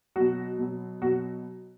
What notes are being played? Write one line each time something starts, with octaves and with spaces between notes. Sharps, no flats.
B2 F#3 F#4
B2 F#3
B2 F#3 F#4